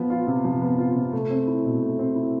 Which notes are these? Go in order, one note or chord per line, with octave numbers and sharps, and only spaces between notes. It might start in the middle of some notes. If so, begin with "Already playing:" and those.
Already playing: F3 B3
F4
C3
F3
B3
F4
C3
A3
C4
E4
B2
A3
C4
E4